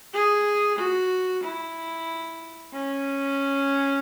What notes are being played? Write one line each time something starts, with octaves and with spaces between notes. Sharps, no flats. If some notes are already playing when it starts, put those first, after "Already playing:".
G#4
F#4
E4
C#4